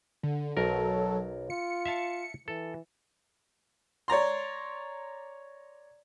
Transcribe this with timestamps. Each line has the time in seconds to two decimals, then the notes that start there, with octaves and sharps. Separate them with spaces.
0.23 D3
0.57 B1 F#3 A4 A#4
1.50 F4 C#7
1.86 E5 F5 A5
2.48 E3 A4
4.08 C#5 D5 A#5 C6